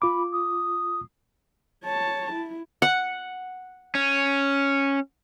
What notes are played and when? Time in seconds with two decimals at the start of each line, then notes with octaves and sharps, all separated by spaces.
0.02 F4 B5 D6
0.33 D#6
1.84 C#5 A5
2.32 E4
2.82 F#5
3.95 C#4